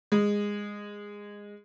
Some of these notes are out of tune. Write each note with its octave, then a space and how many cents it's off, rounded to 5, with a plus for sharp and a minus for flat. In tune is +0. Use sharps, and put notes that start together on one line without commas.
G#3 -15